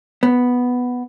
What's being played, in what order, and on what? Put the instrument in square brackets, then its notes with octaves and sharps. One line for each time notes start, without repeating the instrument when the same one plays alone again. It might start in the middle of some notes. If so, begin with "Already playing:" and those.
[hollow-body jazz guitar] B3